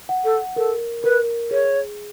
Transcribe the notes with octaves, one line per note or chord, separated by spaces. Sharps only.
F#5
A4
A4 A#4
A#4 B4
G#4 C#5